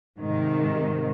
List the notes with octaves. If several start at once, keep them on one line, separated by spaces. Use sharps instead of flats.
G#2 C3 D#3